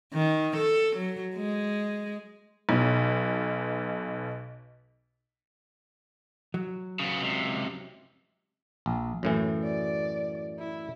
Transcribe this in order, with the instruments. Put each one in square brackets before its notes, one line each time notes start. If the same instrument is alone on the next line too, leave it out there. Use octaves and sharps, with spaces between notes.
[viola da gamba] D#3
A4
F#3
G#3
[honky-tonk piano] B1 B2
[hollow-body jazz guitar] F#3
[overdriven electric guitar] C#3 B3
C#2 C3
[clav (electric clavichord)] A#1
F#2 A2 E3
[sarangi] D5
E4